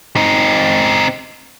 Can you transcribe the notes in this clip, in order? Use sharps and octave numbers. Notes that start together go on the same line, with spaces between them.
C4 D#4